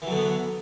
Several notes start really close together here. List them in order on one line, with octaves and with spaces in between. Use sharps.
E3 F#3 D3 B3